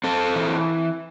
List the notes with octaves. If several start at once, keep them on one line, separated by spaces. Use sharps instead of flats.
C4 A4
E3